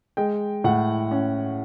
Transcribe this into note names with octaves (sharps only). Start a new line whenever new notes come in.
G#3 G5
A2 F#5
C#4